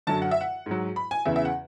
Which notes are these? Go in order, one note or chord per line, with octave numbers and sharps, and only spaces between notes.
F#2 D3 F#3 A5
F#5
E5
F#5
G#2 F#3
B5
G#5
E2 C#3 E3 E5
E5
F#5